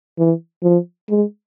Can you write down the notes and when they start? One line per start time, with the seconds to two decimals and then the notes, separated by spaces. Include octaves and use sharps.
0.18 E3
0.63 F3
1.09 G#3